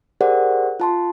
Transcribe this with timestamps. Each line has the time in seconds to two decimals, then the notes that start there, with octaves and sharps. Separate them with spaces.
0.21 G4 G#4 A#4 C5 D5 F#5
0.80 F4 A5 C6